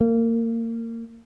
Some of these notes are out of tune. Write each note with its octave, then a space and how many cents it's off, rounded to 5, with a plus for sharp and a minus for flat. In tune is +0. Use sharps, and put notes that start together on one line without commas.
A#3 -25